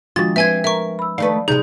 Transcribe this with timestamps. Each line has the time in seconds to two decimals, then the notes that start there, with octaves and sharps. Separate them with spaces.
0.16 D#3 F3 G#3 D4 F4 F#4 A6
0.36 C4 B4 C5 E5 G#5 G#6
0.64 A#4 E5 C#6
0.99 B5 E6
1.18 D#3 A3 B4 D5 F5
1.48 C3 G3 G#3 D#4 G#4 G6